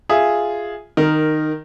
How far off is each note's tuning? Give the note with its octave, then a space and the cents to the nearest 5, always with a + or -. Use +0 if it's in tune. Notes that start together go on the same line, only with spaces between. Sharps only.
F4 +0 G#4 +0 E5 +0
D#3 -10 A#4 +0